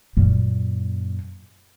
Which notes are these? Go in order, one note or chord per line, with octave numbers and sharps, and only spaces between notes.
F#2 A#2